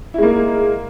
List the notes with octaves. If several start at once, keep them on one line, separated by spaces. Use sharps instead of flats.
G#3 A#3 E4